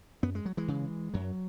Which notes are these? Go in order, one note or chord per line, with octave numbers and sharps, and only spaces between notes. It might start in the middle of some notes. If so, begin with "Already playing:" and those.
F#2 B3
G#3
F#3
E3 G#3
C#3
F#2 F#3